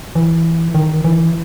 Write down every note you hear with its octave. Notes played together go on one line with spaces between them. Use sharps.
E3
D#3
E3